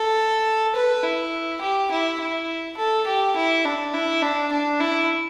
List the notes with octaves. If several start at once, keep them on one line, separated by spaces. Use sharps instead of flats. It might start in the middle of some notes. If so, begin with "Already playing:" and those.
Already playing: A4
B4
E4
G4
E4
E4
A4
G4
E4
D4
E4
D4
D4
E4